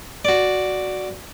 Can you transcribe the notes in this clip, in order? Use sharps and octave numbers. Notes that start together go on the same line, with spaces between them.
F#4 D5